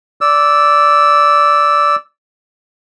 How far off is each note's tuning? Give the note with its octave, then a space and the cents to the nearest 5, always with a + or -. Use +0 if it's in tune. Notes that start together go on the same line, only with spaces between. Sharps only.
D5 -10 E6 +0